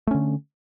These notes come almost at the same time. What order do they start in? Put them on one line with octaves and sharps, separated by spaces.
A3 C#4 D3